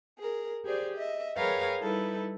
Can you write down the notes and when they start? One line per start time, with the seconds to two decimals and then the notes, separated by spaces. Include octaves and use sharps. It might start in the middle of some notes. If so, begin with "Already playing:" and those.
0.18 G#4 A#4
0.65 G4 G#4 C5 D5
0.97 D#5 E5
1.36 G#4 A#4 B4 C#5 F5 G5
1.80 G3 D#4 E4 A4 B4